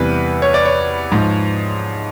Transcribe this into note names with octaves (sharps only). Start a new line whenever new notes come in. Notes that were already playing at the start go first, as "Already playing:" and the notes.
Already playing: E2 C3 E3 G3 B4
C#5
D5
C#5
G#2 F3